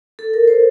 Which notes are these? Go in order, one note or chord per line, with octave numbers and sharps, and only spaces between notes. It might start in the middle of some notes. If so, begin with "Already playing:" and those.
A4
A#4
C5